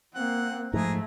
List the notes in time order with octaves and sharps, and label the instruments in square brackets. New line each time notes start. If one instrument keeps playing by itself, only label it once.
[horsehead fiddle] A#3 C4 [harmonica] F#5
[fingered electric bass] G#2 F3 [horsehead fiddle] A3 [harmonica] G#4 A#5